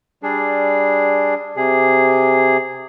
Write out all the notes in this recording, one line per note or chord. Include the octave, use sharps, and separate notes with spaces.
G3 D4 G#4
C3 G#4